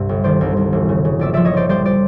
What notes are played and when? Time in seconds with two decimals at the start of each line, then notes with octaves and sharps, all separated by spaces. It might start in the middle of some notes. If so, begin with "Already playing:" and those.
Already playing: C2 G2 C3 E5
0.09 G1
0.24 D#3 C5 D5
0.41 C2
0.57 C2
0.72 E1
0.89 C#3
1.05 C#3
1.19 A#1 D5 E5
1.33 F3 D5 E5
1.45 C#5 D#5
1.54 F3 C5 D5
1.69 G3 C5 D5
1.85 C5 D5